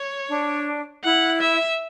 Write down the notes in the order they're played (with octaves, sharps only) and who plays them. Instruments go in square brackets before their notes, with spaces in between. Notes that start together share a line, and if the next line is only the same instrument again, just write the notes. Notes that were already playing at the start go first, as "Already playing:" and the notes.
Already playing: [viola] C#5
[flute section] D4
[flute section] E4 [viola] F#5
[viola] E5